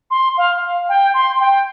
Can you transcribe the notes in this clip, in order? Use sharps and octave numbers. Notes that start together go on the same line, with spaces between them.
C6
F5
G5
C6
G5